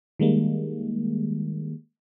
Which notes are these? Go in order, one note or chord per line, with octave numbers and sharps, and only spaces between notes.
D#3 G3 G#3 A#3